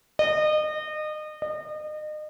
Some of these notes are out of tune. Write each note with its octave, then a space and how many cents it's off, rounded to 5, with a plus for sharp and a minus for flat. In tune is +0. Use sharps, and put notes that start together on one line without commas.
D#5 -30
D#5 -35